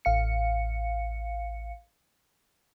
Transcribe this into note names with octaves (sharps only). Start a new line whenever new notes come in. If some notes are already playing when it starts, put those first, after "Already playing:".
A1 F5 C#7